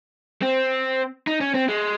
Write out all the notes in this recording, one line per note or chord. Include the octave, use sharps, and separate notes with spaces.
C4
D#4
C#4
C4
G#3